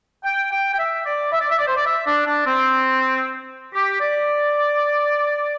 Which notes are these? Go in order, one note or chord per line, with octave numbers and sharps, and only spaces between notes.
G5
G5
G5
E5
D5
E5
D5
E5
D5
C5
D5
E5
D4
D4
C4
G4
D5